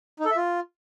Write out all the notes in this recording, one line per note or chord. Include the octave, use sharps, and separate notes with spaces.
D#4
A4
E5
F4